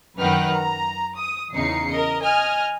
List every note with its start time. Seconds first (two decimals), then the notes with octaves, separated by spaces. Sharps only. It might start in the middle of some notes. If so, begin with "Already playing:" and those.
0.18 F#2 D#3 B4 F#5 G5 F6
0.53 A#5
1.17 D#6
1.52 E2 C#3 D#4 C7 C#7
1.91 A#4 D#5
2.24 D#5 G#5 F6